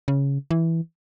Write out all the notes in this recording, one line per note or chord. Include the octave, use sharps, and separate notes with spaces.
C#3
E3